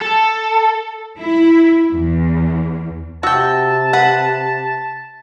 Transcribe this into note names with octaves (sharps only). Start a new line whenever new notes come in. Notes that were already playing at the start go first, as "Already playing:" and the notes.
A4
E4
E2
C3 F#4 G5 A5 E6
B4 F#5 B6